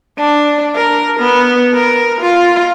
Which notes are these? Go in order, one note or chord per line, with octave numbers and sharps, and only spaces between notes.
D4
A#4
B3
A#4
F4